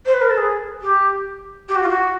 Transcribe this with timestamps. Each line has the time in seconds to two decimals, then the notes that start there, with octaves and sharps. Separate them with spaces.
0.05 C5
0.13 B4
0.21 A#4
0.29 A4
0.37 G#4
0.81 G4
1.68 G4
1.75 F#4
1.82 F4
1.88 F#4